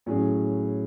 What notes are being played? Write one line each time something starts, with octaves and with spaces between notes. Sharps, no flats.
A2 F#3 C#4 G#4